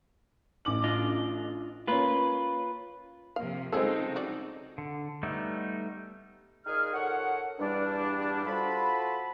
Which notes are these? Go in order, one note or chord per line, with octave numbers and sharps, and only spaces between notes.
A1 D6 F#7
D4 F4 D#5
A#3 C#4 F4 B4
C3 F3 A#3 F5
C#3 G#3 C4 D#4 F4 G#4 A4
F#4 D5
D3
G3 A3 B3 D#4
A#2 D#4 G#4 F6
D#2 A#2 A4 C#5 F#5
E2 G2 G3 D4
F4 F#4 A4 C5 A5 B5